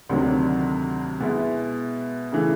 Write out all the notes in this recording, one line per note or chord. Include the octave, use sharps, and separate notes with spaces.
D2 C3 D#3 F#3
B2 G#3 B3 E4
C#3 E3 A3